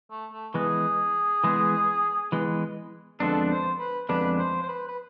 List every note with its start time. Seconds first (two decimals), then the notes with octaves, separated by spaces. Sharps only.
0.11 A3
0.32 A3
0.54 E3 G#3 B3 G#4
1.44 E3 G#3 B3
2.32 E3 G#3 B3
3.20 F2 D3 G#3 B3 D4 A4
3.51 C5
3.79 B4
4.09 F2 D3 G#3 B3 D4 B4
4.39 C5
4.63 C5
4.68 B4
4.88 B4